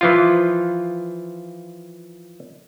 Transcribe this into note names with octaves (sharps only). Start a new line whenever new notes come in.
E3 F3 F4